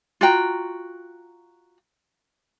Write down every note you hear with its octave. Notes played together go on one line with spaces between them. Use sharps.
F4 F#4 G5 A#5